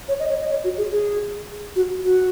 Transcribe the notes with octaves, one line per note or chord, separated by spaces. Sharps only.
C#5
D#5
C#5
D#5
C#5
F#4
G#4
G#4
F#4
F#4